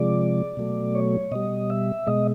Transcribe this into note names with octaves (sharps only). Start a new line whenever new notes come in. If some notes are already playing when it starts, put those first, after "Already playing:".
Already playing: C3 F3 G#3 D5
B2 F#3 A3
C#5
B2 G3 D#5
E5
B2 G#3 D#5